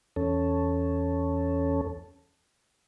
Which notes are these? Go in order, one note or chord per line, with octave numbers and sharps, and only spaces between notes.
E2 C#4 A4